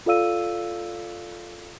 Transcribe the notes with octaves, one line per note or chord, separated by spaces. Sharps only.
F4 A4 D5 F5 E6 D#7